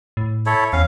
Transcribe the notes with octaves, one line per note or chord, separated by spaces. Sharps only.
A2
E4 A4 C#5
E2 C#4 F5